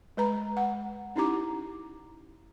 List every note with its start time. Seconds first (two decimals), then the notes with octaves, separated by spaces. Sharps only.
0.17 G#3 B4 A#5 B5
0.57 F#5
1.16 C#4 D#4 E4 G4 A#5 D6